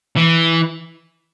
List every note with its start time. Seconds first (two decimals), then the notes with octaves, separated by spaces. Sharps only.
0.17 E3